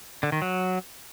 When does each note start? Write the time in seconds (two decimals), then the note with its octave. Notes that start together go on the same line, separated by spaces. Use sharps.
0.23 D3
0.32 D#3
0.42 F#3